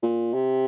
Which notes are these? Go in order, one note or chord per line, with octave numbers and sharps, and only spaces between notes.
A#2
C3